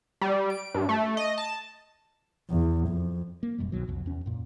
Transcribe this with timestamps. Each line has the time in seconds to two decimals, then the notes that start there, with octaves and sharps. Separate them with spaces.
0.21 G3
0.50 D7
0.74 G2
0.89 A3
1.17 D#5
1.38 A5
2.50 E2
2.88 F2
3.43 A#3
3.58 F1 F#2 B2 G3
3.72 C2 B2 D#3 F#3
3.88 C2 F2
4.06 E2 C#4
4.26 F#2 A#2